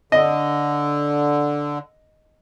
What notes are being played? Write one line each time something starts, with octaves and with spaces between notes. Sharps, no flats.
D3 D#5